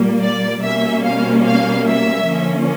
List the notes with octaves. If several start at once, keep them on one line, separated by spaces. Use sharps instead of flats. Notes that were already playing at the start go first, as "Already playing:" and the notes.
Already playing: A#2 G3 A#3
D5
B2 G3 A#3 C#4 E5
F5
F5
E5
D3 F3 A#3 C#4